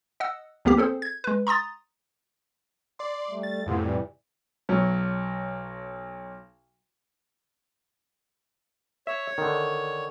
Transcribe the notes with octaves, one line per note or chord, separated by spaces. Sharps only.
D#5 F#5 E6
D2 F3 A#3 B3 G4 B6
C4 G#4 A4 C5
G#6
G#3 B4
A#5 C6 D#6 A6
D5 C6
G3 A3
A6
F2 A2 C3 B3 F4 G#4
E3 G3
B1 F#3
C#5 E5
D3 D#3